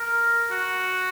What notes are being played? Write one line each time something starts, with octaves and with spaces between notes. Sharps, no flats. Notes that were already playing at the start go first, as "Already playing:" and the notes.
Already playing: A#4
F#4